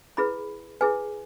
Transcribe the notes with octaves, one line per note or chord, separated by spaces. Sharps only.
E4 G#4 B4 B5
E4 G#4 B4 G#5